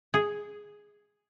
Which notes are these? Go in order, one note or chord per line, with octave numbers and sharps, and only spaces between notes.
G#4